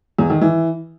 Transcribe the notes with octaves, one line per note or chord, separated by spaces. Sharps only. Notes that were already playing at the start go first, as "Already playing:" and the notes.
E2
D#3
E3